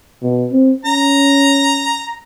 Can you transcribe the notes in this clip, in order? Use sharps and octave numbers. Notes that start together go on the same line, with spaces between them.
B2
C4
C#4 A#5